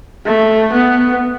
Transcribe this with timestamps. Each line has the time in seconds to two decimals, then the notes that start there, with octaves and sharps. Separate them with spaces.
0.26 A3
0.72 B3